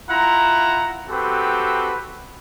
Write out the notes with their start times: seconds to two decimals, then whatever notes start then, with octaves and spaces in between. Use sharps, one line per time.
0.10 E4 F4 F#5 A#5
1.09 C4 F#4 G4 A4 B4